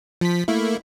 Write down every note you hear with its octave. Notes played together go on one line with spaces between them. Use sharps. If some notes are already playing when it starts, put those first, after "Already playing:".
F3 B6
A3 A#3 E4